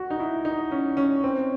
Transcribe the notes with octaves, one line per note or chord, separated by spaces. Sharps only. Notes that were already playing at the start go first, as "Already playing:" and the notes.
Already playing: F#4
D#4
E4
D#4
C#4
C#4
C4